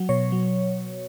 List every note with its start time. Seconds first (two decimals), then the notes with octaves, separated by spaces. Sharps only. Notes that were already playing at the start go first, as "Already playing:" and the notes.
Already playing: F#3
0.09 B2 C#5
0.32 F#3